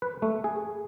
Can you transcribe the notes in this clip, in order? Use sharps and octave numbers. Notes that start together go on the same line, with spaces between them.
B4
A3
G#4